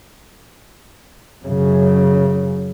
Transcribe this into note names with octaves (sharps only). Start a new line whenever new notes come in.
F#2 C#3